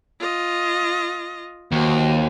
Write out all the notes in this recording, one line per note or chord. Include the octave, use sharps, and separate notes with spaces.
F4 D#5
D#2 F#4 C5